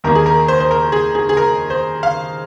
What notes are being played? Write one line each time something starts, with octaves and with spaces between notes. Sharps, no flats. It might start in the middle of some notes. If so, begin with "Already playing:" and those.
D#2 D#3 A#3 A#4
G#4
A#4
C5
C5
A#4
G#4
G#4
G#4
A#4
C5
F5